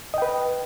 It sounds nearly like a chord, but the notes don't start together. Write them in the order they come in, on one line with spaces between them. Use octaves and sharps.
D#5 G5 B4